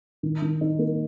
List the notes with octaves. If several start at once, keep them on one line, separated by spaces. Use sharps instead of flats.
D#3
D#3
D#4
A#3